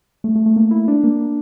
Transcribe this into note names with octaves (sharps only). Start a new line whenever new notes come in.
A3
A3
A3
A#3
E4
D4
A#3